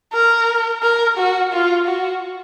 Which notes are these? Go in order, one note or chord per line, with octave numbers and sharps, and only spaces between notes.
A#4
A#4
F#4
F4
F#4